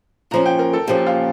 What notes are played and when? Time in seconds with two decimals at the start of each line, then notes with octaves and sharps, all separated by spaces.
0.31 A#2 F3 C#4 A#5
0.46 G5
0.59 A#4
0.73 A4
0.88 A#2 F3 C#4 G4
1.06 F4